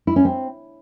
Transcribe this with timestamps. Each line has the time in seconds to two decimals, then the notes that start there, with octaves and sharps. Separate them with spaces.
0.07 E4
0.16 C#4
0.25 C4